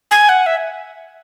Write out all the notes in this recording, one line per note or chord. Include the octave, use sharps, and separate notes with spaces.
G#5
F#5
E5